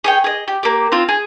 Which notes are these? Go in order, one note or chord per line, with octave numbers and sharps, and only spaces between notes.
G#4 C#5 G5
G#4 D#5
G4
A#3 G4
C4 F4
G#4